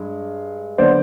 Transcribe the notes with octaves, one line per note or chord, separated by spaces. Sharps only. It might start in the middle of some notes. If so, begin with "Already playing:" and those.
Already playing: G2 G#3
D3 F#3 B3 C5 D5